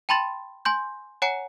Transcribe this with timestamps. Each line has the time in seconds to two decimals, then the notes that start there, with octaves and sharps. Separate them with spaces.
0.09 G5 A5 B5 C6 A6 E7
0.65 G#5 C6 G6
1.22 C#5 F#5 G#5 A#5 C#7